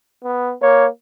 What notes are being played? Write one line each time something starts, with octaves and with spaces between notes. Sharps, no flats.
B3
A#3 C#5